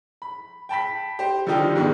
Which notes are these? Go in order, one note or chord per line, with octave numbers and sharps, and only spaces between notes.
B5
G5 A5 B5 B6
G4 C5
D3 D#3 F3 G3 D#4 G4
G#2 B2 D#3 G3